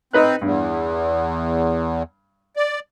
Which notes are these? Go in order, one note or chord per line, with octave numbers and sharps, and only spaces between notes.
C4 D#4 B4 F#6
E2 G2
D5